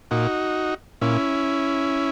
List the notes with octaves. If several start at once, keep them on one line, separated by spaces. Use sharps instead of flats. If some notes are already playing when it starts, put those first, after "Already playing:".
A#2 D#4 F#4
A#2 C#4 E4